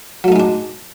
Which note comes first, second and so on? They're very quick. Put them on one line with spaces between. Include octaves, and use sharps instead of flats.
F#3 A3 D#4 G#3 D4